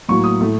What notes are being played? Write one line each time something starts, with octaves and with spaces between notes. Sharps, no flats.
A2 F#3 A#3 C#6
D#6
A2 A3